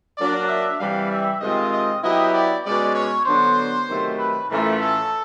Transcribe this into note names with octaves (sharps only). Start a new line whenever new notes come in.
F#3 A#3 D4 D5
E5
C3 E3 G3 F5
E5
C3 D#3 G#3 C4 F4 D#5
D#5
F#3 B3 E4 G4 D#5
D5
B2 G#3 C#4 D5
C#5
D3 F#3 B3 D4 C5
C3 D#3 F#3 A3
B4
A2 E3 A3 C#4 F4 A#4
A4